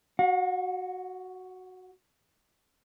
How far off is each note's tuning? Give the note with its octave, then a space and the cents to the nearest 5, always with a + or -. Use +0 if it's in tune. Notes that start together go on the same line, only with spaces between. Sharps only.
F#4 +0 F#5 -45